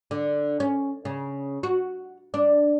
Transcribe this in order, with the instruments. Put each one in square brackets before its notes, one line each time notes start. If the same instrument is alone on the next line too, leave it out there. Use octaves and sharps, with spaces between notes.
[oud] D3
C#4
C#3
F#4
D4